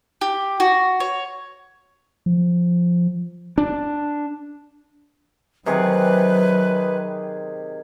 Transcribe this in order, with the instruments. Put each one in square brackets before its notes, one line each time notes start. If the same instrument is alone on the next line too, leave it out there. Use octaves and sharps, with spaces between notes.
[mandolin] G4
F#4
C#5
[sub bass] F3
[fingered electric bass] D4
[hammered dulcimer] C3 D#3 G#4 [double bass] F#3 [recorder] B4